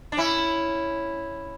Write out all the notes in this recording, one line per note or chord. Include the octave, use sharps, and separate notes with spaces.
D4
C#4 E4